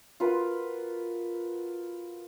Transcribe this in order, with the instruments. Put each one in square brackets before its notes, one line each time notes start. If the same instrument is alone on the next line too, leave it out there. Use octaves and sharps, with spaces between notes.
[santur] F4 F#4 A#4 B4